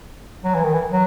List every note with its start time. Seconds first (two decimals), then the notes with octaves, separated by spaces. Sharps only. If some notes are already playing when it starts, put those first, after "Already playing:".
0.44 F#3
0.55 E3
0.64 D#3
0.73 E3
0.91 F#3